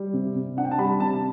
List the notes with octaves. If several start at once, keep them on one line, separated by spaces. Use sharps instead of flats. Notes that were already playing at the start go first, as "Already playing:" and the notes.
Already playing: G3
C3
C3
D4 F#5
G5
A5
G3 B5
C3 A5